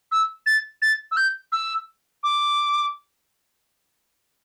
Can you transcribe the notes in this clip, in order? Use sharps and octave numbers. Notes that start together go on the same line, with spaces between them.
E6
A6
A6
E6
G6
E6
D6